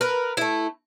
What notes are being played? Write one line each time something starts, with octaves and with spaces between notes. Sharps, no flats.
A#4 B4
A3 E4